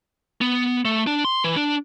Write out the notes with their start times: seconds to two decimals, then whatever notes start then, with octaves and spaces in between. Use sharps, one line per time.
0.41 B3
0.85 A3
1.07 D4
1.25 C6
1.44 E3
1.56 D4